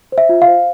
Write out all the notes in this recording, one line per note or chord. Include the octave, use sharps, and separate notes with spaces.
C5
E5
F4
F5
C5